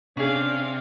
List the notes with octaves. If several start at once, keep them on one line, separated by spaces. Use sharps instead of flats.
C3 C#4 D4 G#4 F5